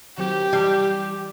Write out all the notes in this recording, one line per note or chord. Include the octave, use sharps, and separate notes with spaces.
D#3 F#3 C4 G4
E3 G3